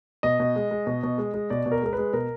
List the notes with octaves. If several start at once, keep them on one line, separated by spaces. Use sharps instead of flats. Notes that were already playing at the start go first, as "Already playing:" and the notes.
B2 D#5
B2
G#3
G#3
B2
B2
G#3
G#3
B2 D5
B2
A#4
G#3 A#4
G#3 B4
B2 A#4